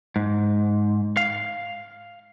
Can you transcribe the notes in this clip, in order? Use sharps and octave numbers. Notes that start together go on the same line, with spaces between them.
G#2
F5